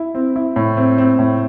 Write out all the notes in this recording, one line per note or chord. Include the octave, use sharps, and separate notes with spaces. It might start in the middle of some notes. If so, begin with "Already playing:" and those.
Already playing: E4
C4
E4
A2
C4
C4
A2